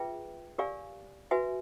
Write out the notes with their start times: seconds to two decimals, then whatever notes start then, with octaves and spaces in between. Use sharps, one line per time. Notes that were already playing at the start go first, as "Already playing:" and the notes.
Already playing: F4 G#4 B4 E5 G5
0.58 G4 A#4 D5 F5 G#5
1.31 F#4 B4 E5 G#5